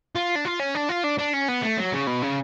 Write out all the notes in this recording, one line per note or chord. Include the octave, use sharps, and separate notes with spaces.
F4
D4
F4
C#4
D4
F4
D4
D4
C#4
B3
A3
F#3
C#3
B2
C#3